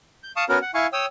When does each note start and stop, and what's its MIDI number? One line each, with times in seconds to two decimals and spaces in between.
0.23 0.32 91
0.36 0.44 77
0.36 0.44 81
0.36 0.44 85
0.36 0.44 87
0.49 0.59 59
0.49 0.59 61
0.49 0.59 66
0.49 0.59 70
0.62 0.71 78
0.74 0.87 64
0.74 0.87 77
0.74 0.87 80
0.74 0.87 85
0.93 1.06 73
0.93 1.06 79
0.93 1.06 87
0.93 1.06 88